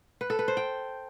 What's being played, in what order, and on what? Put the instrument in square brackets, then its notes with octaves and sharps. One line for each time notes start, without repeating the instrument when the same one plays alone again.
[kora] B4
A4
B4
C5
G5